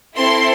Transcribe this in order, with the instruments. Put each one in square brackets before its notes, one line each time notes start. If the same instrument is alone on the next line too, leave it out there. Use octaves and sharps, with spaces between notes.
[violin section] C4 E4 A4 C6